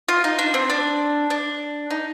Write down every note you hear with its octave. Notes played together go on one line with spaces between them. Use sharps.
F4
D#4
D4
C4
D4
D4
D#4